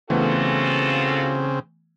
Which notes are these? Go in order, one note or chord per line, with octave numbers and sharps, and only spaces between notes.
C#3 E3 A3 B3 C4 F4 F#4 A4